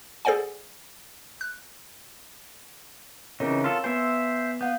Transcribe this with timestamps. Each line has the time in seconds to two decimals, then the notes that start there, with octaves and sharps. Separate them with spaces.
0.25 G#4 A4 C5 D5 F#5 G#5
1.41 F#6
3.40 C#3 E3 C4 D#4 A#4 C#5
3.64 F4 A4
3.84 B3 B4 C5 E5 G#5
4.61 B3 F5 F#5 G6